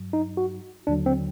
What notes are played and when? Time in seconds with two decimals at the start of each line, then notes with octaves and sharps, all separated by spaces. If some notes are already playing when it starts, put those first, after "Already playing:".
Already playing: G2 F#3
0.13 D#4
0.37 F#4
0.87 D#2 D3 F#3 D4
1.06 C4